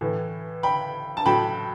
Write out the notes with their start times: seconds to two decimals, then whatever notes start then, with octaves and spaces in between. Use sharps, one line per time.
0.01 A2 E3
0.63 G5 B5
1.17 A5
1.26 A2 F#3 G5 B5